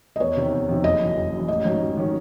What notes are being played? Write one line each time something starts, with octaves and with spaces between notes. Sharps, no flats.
D#5
E2 C#5
C3 D#3
E2
C3 D#3
F#1 D#5
F#2 E3
F#1
F#2 E3
A1 D#5
G#2 D#3 F#3 C#4
A1
D#3 F#3 C#4